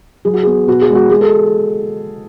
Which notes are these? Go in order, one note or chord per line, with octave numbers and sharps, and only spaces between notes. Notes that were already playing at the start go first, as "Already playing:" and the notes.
F#3 G#4
F#4
B3 G#4
B2 F#4
G#4
G#3
F#4
G#3 G#4
A4